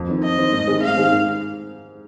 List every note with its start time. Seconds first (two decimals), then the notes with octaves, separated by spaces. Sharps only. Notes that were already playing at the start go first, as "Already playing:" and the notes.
Already playing: F2
0.09 D#3 C4
0.22 F2 D#5
0.38 D#3 C4
0.53 G#2
0.67 D#3 C4 G#4
0.82 G#2 F5
0.97 D#3 C4 G#4
1.12 G#2